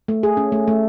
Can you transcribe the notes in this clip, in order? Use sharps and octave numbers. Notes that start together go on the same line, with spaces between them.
A3
G#4
C#4
A3
A3